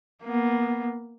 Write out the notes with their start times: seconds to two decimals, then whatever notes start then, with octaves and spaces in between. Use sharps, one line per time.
0.24 A#3 B3